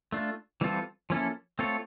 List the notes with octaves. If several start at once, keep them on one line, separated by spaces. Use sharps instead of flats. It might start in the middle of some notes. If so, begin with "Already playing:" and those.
A3 D4 F4
E3 G3 C4 F4 A4
F3 A#3 C#4 E4 A4
A3 C4 F4 A4 C#5